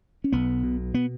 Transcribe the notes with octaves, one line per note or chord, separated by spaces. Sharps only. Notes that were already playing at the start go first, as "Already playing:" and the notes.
C#4
B1 B3
B2
B3